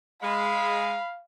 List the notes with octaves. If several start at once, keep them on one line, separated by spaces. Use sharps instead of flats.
G#3 F5 B5